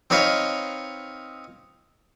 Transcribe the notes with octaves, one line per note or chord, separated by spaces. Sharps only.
C4 D#4 B4 C#5 D#5 F5